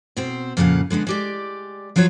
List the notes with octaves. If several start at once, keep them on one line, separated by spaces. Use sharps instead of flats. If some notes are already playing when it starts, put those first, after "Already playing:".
B2 C4 C5
F2 A#2 C#3 A4 F5 F#5
D3 G#3 B3 D4
G#3 G4 D5
F3 F#3 F4 F#4 C#5